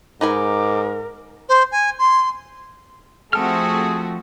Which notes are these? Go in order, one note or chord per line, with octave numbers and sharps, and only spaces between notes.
G#2 D#4 A#4 B4 G#5 D6
C5
G#5
C6
F3 A3 C4 F#4 G#4 A4 G5 F6